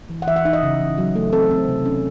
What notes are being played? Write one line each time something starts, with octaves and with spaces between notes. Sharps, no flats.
E3
F#5
E3 E5
F#5
D#4 E5
D#5
C#3
E3
F#3
A3
C4 A4
C4
C3
C#4